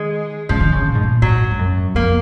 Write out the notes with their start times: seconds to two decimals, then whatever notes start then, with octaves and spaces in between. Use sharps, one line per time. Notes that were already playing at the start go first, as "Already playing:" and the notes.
Already playing: D#3 G#3
0.49 C#3 F3
0.60 D#3
0.72 C#3
0.86 A#2
0.95 G#2
1.03 A#2
1.22 G#2 F#3
1.51 G#2
1.59 F#2
1.95 F2 A#3